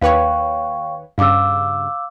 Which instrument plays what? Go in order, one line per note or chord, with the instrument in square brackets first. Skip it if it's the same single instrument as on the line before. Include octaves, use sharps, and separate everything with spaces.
[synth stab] D#2 B4 C#5 [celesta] F5 G5 C#6
[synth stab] G2 C#3 [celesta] F5 D6 E6